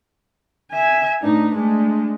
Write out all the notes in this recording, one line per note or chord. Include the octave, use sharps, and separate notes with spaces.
E5 G#5
A2 D4 D#4 B4
G#3 A3 D4